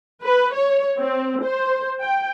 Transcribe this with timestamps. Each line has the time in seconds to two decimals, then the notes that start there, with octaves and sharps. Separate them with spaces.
0.24 B4
0.54 C#5
0.98 C4
1.44 C5
2.01 G5